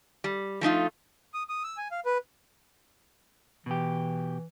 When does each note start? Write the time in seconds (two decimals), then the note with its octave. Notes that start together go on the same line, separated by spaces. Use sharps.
0.24 G3
0.61 F3 A3 D#4 F4
1.34 D#6
1.49 D#6
1.64 E6
1.77 G#5
1.91 F5
2.06 B4
3.66 B2 E3 G4